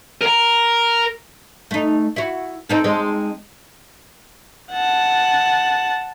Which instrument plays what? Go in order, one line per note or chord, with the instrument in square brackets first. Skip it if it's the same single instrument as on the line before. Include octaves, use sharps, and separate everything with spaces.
[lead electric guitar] A#4 A#5
[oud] A3 D#4
E4 F#4
C4 D#4 A4
G#3 C4 D#4
[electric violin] F#5 A5